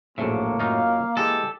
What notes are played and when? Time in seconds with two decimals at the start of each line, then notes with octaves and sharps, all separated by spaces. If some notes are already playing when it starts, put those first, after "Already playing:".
0.18 A#1 F#2 A2 A#3 A4 E5
0.59 F#2 D#4 F4 F5
1.17 E3 G#3 G4 A4